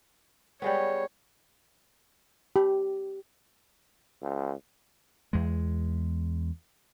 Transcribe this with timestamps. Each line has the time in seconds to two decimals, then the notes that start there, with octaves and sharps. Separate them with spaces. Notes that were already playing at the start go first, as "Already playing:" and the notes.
0.62 G3 G#3 B3 C#5
2.56 G4
4.22 C#2
5.33 E2 G#3